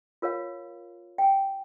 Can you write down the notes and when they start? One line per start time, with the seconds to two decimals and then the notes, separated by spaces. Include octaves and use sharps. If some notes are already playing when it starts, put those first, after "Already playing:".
0.22 F4 A#4 C#5 F5
1.18 G5 G#5